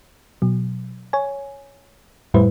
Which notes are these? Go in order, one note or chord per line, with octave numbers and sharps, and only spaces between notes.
B2 F#3
C#5 G#5
F2 A2 G3 E4 B4 C5